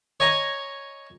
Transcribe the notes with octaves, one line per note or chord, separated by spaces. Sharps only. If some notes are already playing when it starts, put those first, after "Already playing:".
C#5 D#5 G#5 A#5